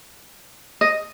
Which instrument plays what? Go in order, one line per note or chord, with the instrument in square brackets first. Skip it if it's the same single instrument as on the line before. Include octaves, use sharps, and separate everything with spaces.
[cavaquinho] D#5